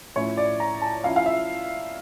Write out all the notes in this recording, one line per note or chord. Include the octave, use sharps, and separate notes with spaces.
A2 F3 C#4 E4 C#5
D5
A#5
A5
F3 C#4 E4 F5
F5
E5